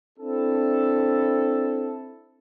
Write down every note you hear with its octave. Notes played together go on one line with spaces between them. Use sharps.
C4 D4 E4 A4